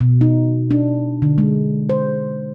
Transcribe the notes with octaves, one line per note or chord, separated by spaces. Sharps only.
B2
D#4
D4
D3
G#3
C5